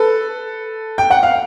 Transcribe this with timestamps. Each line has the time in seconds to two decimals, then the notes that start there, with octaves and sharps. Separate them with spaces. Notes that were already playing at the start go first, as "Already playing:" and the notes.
Already playing: A4 B4
0.98 G5
1.10 F#5
1.23 F5